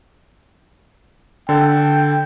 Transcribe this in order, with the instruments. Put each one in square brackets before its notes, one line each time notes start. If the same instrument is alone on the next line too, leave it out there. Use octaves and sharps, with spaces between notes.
[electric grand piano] D3 A4 [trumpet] G5